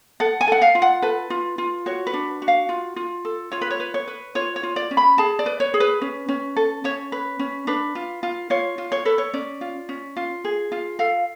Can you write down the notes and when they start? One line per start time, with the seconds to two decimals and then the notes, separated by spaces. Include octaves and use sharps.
0.20 A4 F#5
0.41 G#5
0.48 A4 F#5
0.62 F5
0.75 F4
0.82 F#5
1.02 A4 B4
1.30 F4
1.58 F4
1.86 F#4 C#5
2.07 B4
2.14 D4
2.42 F#4
2.48 F5
2.69 F4
2.96 F4
3.25 A4
3.52 F4 C#5
3.61 B4
3.70 C#5
3.80 B4
3.94 C#5
4.08 B4
4.35 F4 C#5
4.56 C#5
4.63 F4
4.76 D5
4.91 C#4
4.97 B5
5.18 G#4 A5
5.39 D5
5.46 B4
5.60 C#5
5.74 G#4
5.80 B4
6.01 C#4
6.29 C#4
6.56 A4
6.84 C#4 C#5
7.12 B4
7.39 C#4
7.67 D4 B4
7.95 F4
8.23 F4
8.50 F4 C#5
8.78 F4
8.92 C#5
9.05 A4 B4
9.18 C#5
9.34 C#4 D5
9.61 F4
9.89 C#4
10.17 F4
10.44 G#4
10.72 F4
10.99 A4 F5